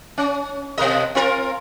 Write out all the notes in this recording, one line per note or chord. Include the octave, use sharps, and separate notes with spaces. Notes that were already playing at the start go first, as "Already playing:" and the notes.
C#4
B2 A#4 D#5
C4 F4 A#4